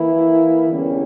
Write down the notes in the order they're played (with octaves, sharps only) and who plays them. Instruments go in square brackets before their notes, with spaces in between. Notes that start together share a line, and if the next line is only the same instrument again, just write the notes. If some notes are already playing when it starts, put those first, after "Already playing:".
Already playing: [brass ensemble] E3 A#3 E4
E2 D3 G3 C#4